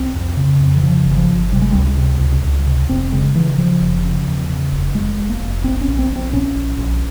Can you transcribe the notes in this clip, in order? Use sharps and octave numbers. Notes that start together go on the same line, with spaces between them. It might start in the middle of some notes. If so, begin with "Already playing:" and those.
Already playing: C2 C4
F2
C#3
F2
E3
C#3 F3
G1
E3
F3
G1
C3 G3
G#3
C#2 G3
C3
C#2
C#2
C3
F1 C4
C#3 G#3
C#3 E3
C#3 F3
F1
C#3
E2
C#3
F1
F1 G#3
F1
A#3
F1
A#1 C4
C#4
A#1
C4
A#1
C4
A#2 C#4
A#1
A#1